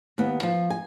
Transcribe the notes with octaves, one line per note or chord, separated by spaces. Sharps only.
D#2 B3
F3
G#5